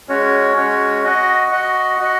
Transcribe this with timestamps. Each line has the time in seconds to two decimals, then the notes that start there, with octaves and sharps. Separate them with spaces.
0.08 G#3 C#4 F#4 C#5
0.56 G#3 C#4 F#4 C#5
1.04 F#4 D#5 F#5
1.51 F#4 D#5 F#5
1.99 F#4 D#5 F#5